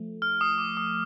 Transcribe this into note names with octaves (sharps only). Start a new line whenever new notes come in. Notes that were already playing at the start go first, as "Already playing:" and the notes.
Already playing: F3 A3
F6
D#6
D6
D#6